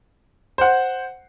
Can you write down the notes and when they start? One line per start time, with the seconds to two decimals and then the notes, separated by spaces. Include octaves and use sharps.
0.58 C5 F#5